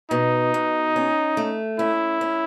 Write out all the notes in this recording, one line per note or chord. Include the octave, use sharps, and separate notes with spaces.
B2 D#4
B2
C#4
A3
C#4 E4
C#4